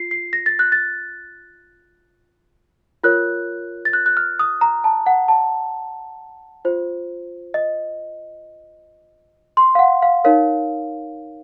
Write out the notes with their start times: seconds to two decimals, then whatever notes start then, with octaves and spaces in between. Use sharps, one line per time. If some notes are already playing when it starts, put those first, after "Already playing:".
Already playing: F4 C7
0.11 C7
0.33 A#6
0.46 A6
0.59 F#6
0.72 A6
3.04 F4 A#4 C#5 F#6
3.85 A6
3.93 F#6
4.06 F#6
4.17 F6
4.39 D#6
4.61 A#5
4.84 A5
5.06 F#5
5.28 A5
6.65 F4 C5
7.54 D#5
9.57 C6
9.75 F5
9.79 F#5
10.02 F5
10.24 D#4 A#4 C#5 F5